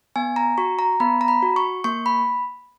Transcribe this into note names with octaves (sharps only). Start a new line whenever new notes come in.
B3 G#5
A#5
F#4 C#6
A#5
B3 B5
A#5
B5
F#4
C#6
A#3 C#6
B5